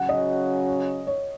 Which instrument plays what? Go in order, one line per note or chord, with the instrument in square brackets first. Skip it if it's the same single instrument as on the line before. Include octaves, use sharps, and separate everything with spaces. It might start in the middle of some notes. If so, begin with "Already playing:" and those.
Already playing: [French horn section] C#3 F#3 C#4 F#4 [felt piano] F#5
[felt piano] D#5
C#5